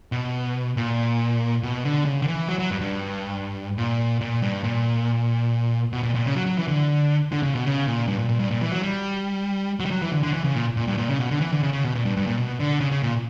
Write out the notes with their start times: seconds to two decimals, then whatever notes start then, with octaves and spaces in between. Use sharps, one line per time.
0.12 B2
0.77 A#2
1.63 B2
1.84 D3
2.05 C#3
2.22 D3
2.28 E3
2.49 F#3
2.59 F#3
2.71 G2
2.81 G2
3.78 A#2
4.21 A#2
4.42 G2
4.64 A#2
5.92 B2
6.03 A#2
6.15 A#2
6.25 C#3
6.36 F#3
6.46 F#3
6.58 E3
6.68 D3
7.32 D3
7.43 C#3
7.55 B2
7.65 C#3
7.87 A#2
8.08 G2
8.19 A#2
8.29 A#2
8.40 G2
8.51 A#2
8.62 E3
8.72 F#3
8.83 G3
9.80 F#3
9.86 G3
9.91 F#3
10.02 E3
10.12 D3
10.23 D3
10.34 E3
10.44 C#3
10.55 A#2
10.77 A#2
10.87 G2
10.98 A#2
11.09 C#3
11.19 B2
11.31 D3
11.41 E3
11.52 D3
11.63 C#3
11.73 C#3
11.84 B2
11.95 A#2
12.05 G2
12.17 G2
12.27 A#2
12.37 B2
12.60 D3
12.80 C#3
12.91 C#3
13.03 A#2